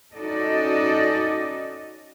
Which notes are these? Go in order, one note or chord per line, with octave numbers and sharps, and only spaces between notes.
C#4 D#4 F#4 A4 D5 D#5